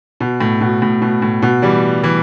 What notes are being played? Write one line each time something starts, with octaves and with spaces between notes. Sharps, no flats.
B2
A2
B2
A2
B2
A2
B2
E3 G3
E3 G3